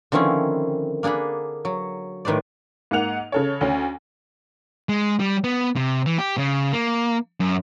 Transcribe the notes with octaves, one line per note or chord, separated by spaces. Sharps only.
D3 D#3 F3 C4 C#4 E4
A#3 D4 G#4 F#5 B5
F#3
A2 D#3 B4 C5 D5
G#2 A#3 F#5 F7
C#3 A4 C#5
D2 C#4
G#3
G3
B3
C3
E3
G4
C#3
A#3
F#2